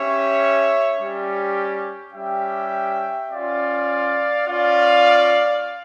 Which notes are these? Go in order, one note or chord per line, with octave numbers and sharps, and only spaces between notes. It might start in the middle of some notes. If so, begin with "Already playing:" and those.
Already playing: C#4 G4 C#5 E5
G3 C#4 G4
G3 C#4 G4 E5 G5
C#4 F4 D5 F5
C#4 F4 D5 F5